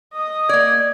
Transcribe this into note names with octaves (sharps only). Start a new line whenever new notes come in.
D#5 D#6
A#3 D5 G#6